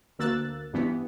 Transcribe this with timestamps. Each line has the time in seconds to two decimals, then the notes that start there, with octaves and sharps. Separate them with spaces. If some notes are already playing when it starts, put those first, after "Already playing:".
0.19 D2 A#3 E6 F#6 A6
0.73 G2 E3 B3